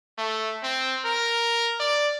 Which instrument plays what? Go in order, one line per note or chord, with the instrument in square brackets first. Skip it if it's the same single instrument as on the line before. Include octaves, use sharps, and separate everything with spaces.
[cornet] A3
C4
A#4
D5